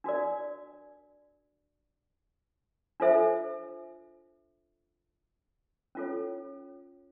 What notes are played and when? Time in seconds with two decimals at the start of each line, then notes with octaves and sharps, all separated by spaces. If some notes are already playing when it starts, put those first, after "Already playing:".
0.04 D4 F#4 A#4 D5
3.00 D4 F4 A4 C5 E5
5.95 C#4 F4 A4 C#5